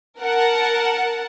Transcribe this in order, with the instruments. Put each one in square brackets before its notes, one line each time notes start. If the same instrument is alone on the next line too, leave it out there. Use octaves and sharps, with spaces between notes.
[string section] A#4 F#5 A5